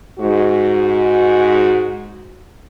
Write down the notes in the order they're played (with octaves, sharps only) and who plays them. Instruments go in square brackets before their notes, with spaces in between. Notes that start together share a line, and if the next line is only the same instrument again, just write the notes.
[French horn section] G#2 F#4